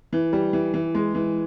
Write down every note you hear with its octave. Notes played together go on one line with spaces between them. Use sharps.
E3
G3
E3
E3
G#3
E3